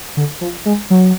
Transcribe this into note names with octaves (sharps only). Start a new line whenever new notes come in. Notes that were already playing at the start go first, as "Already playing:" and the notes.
D3
F3
G#3
F#3